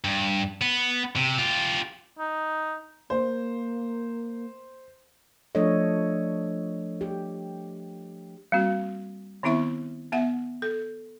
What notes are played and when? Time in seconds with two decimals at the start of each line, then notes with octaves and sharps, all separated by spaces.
0.04 G2
0.61 B3
1.16 C3
1.38 F4 G4
2.18 D#4
3.10 A#3 C5
5.55 F3 A3 D4 A4 C#5 D#5
7.01 G4
8.52 G3 A#3 C4 F#4
9.43 D#3 B3 C4 E4 E5 C#6
10.12 B3 E5 F#5
10.62 A4